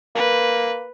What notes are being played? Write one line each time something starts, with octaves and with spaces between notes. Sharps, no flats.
A#3 B4